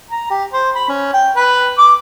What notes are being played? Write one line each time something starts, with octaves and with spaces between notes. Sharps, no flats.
A#5
G4
C5
B5
C#4
G5
B4
D6